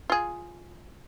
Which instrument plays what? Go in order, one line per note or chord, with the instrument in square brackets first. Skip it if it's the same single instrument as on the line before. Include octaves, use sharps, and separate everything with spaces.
[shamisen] F4 G#4